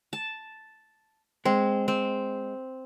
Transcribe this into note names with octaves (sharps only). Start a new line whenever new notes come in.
A5
G#3 C4
C4